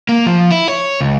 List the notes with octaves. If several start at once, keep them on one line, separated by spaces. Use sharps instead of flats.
A#3
F3
E4
C#5
C#2